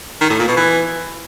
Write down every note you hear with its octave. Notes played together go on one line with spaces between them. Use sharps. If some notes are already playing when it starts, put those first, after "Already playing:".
D#3
A2
A#2
B2
E3